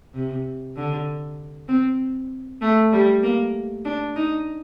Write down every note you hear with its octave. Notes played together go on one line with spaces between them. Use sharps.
C3
D3
C4
A3
G3
A#3
D4
D#4